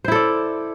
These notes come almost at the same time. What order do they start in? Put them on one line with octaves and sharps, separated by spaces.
C5 E4 A4 D5